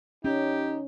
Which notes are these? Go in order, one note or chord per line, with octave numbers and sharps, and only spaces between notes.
C#4 D#4 G4